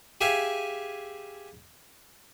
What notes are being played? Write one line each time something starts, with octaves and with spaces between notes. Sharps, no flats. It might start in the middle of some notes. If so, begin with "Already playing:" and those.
G4 G#4 E5 F5 G#5